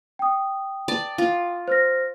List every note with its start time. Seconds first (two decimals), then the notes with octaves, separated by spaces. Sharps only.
0.19 G5 D#6
0.88 D5 A5
1.18 F4
1.68 C5 F6 A#6